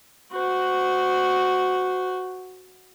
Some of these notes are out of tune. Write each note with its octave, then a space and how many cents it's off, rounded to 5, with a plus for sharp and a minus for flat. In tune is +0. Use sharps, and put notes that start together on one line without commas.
F#4 +0 C5 -25